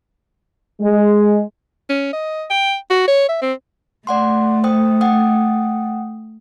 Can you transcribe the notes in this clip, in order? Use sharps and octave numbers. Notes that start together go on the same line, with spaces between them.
G#3
C#4
D#5
G5
F#4
C#5
E5
C4
A3 D5 F#5 C6
C5 G5 D#6
F#5 G5 D#6